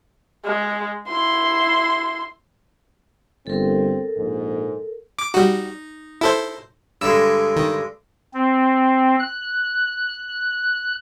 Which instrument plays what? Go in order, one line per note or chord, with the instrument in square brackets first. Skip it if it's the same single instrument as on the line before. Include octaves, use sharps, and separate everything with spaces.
[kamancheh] G#3
E4 C6
[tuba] G1 [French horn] C4 [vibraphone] A4 A#4
[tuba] A#1 [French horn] G#2
[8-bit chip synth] D6
[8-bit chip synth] G3 F#4 [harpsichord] D#4
[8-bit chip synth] E4 A4 C5
[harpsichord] G2 D3 G#3 [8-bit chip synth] E6
[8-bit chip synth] D#3
[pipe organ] C4
F#6